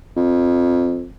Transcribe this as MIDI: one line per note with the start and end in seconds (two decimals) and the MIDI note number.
0.16 1.06 41